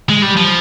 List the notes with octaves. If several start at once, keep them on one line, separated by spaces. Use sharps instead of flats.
G#3
G3
F3